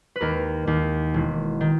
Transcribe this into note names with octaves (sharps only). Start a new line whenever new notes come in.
B4
D#2 A#4
D#2
E1
D#3